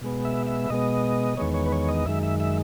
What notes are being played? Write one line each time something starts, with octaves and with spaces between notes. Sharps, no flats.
B2 G#3 B3
E5
E5
B2 G#3 B3 D#5
E2 D#3 G#3 B3 C#5
C#5
B4
C#5
D#5
F#2 D#3 G#3 E5
E5
E5